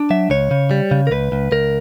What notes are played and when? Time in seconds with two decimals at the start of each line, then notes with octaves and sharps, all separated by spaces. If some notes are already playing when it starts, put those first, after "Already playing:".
Already playing: D4
0.10 F#3 E5
0.30 C#2 C#5
0.51 C#3
0.71 G3
0.91 C#3
1.07 A#4
1.11 C#2 B4
1.32 C#2
1.52 C#2 A#4